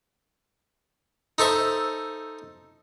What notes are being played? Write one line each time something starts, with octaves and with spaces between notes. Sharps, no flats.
D#4 A4 C5 E5